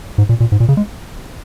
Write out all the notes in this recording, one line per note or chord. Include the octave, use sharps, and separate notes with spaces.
G#2
A#2
A#2
G#2
A#2
C#3
G#3